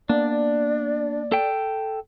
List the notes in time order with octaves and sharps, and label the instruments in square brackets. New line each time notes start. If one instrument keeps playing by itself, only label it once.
[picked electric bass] A#3 B3 [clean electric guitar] D4 [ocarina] D5
[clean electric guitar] A4 G5